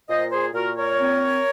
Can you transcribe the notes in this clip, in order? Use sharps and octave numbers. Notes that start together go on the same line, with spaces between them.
A#2 C5 D#5
G#4 C5
A#2 F#4 A#4
A#4 C#5
C4